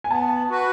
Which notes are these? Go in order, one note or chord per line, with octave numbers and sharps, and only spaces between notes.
G#5
B3 A5
F#4 B4